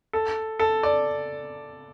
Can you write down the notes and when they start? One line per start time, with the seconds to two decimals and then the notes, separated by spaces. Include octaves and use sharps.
0.13 A4
0.59 A4
0.83 D5